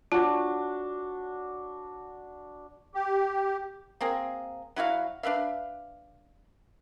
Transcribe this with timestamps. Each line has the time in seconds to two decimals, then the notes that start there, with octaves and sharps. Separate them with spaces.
0.12 D4 F4 F#4
2.95 G4
4.01 A#3 C4 G#4
4.76 F#3 E4 F#4 F5
5.23 D4 B4 E5 F5